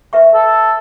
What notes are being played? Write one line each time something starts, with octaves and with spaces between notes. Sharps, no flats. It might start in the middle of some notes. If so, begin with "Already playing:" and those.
B4 E5 C#6
A4